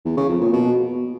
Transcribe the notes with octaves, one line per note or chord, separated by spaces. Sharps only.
E2
C#3
F2
A#2
B2